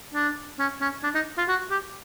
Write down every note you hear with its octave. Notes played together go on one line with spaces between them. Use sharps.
D4
C#4
C#4
D4
D#4
F4
F#4
G4